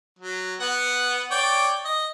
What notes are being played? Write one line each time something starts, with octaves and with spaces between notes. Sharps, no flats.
F#3
B3 F#5
C#5 D5 G5
D#5